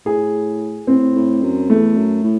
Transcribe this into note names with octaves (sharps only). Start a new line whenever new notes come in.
A2 G#4
A2 C4
A2
F#2
E2 A3
F#2
A2